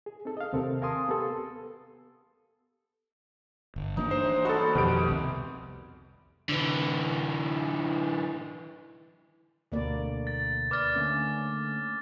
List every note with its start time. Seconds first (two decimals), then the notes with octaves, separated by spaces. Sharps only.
0.06 G#4
0.25 C4 D#4 A4
0.37 D#5 F5
0.53 D#2 C3 C4 A4 A#4
0.82 A#4 F5 G#5 A5 C6 D#6
1.09 B3 G4 A4
3.76 G1
3.97 E3 A#3 D4 D#4
4.11 G#3 C5
4.45 G3 G#3 B3 F#4 A4
4.75 F2 B2 D#3 G4 D7
5.08 C2 C3
6.49 D3 E3
9.72 D2 B2 D3 A#3 D5
10.27 A6
10.71 B4 D5 D6 F6 A6
10.95 D3 A3 A#3 C#4